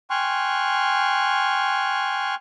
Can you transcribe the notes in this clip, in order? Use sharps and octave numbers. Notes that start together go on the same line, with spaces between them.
G5 G#5 C6 C#6 F6 F#6